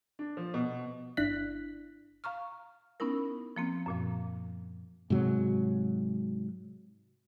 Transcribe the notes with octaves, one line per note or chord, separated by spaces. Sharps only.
D4
F3
B2
G1 D4 E4 F#6 B6
F5 A#5 C#6 F6
B3 C#4 D#4 E4 A#4
F3 A#3 C4
F#2 A#2 F3
G#2 C3 F#3